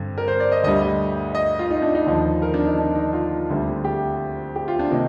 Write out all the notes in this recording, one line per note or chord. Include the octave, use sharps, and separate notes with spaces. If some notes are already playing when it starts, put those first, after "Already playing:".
Already playing: G2 D3 C4
A#4
C5
D5
D#5
D2 D3 G3 D#5
D#5
D#5
F4
D#4
D4
D#4
D#2 D3 F3
A#4
D4
D#4
D4
D#4
F4
D2 D3 G3 C4
G4
G4
F4
D4
C3 D#3 A#3 D#4